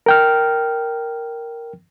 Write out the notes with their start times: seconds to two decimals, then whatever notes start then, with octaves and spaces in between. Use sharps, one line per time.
0.06 A#4 G5 F6